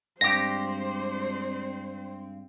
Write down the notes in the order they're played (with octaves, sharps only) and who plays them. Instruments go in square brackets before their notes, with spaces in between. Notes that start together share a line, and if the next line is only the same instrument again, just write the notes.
[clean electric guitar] G2 G4 [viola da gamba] G#3 C4 [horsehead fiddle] C5 [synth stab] A#6